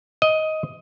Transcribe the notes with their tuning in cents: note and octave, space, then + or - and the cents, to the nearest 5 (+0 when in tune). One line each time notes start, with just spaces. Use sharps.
D#5 +10